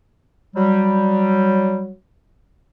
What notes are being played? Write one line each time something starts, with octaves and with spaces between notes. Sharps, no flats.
F#3 G3